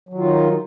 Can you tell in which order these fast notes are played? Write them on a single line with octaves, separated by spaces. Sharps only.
F#3 D#3 F4 D#4